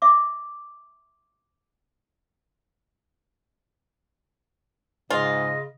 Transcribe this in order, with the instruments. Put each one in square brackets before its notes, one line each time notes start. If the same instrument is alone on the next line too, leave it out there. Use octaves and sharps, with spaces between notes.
[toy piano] E5 D6
[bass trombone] G#2 [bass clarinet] C#3 [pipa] F4 [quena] D#5